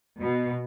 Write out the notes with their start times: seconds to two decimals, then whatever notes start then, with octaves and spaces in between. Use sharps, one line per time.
0.19 B2